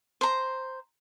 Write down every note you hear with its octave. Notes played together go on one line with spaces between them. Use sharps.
C5 A#5